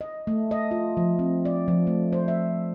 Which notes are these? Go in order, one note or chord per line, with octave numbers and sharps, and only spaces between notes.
D#5
A3
D#5
F4
F3
C4
D5
F3
A3
C5
E5